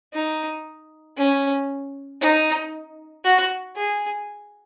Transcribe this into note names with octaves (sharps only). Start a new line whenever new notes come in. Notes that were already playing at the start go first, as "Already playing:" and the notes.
D#4
C#4
D#4
F#4
G#4